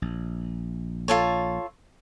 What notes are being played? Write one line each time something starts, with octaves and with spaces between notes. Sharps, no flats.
A#1
F4 A4 C#5